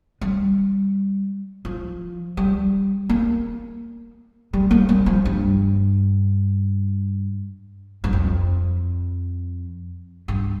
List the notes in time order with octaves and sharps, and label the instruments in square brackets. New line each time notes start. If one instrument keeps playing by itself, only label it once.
[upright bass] G3
F3
G3
A#3
G3
A#3
G3
F3
G2
G2
F2
G2